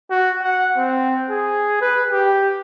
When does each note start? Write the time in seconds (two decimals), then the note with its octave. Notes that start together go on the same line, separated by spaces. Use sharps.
0.10 F#4
0.42 F#5
0.77 C4
1.29 G#4
1.81 B4
2.11 G4